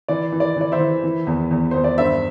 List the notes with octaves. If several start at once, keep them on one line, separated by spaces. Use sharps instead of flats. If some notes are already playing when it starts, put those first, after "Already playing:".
E3 D5
E3
D5
E3 D5
C5 E5
E3
E3
E2
E2
E2 C5
D5
G2 C5 E5